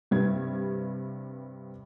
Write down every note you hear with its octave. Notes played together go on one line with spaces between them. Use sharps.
G2 C3 G3 B4 G#6